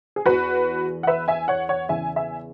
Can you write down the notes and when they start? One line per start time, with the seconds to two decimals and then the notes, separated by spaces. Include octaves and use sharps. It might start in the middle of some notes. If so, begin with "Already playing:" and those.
0.16 G#4
0.26 E2 E3 F#4 B4
1.03 F#5
1.07 B4 E5
1.28 E5 G#5
1.48 C#5 F#5
1.69 C#5 F#5
1.89 E2 C#3 E3 E5 G#5
2.16 E5 G#5